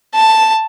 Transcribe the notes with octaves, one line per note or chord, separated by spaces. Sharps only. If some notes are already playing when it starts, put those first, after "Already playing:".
A5